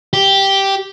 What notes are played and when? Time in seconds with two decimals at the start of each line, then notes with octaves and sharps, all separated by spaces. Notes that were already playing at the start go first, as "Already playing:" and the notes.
0.13 G4